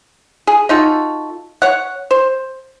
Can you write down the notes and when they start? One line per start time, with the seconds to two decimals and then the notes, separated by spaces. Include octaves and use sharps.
0.47 G#4
0.69 D#4 F4 F#4 A4
1.62 C#5 F#5
2.11 C5